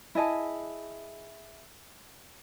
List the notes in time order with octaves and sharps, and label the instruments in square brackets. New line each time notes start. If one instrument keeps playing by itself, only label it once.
[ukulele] E4 G#4 D#5 A5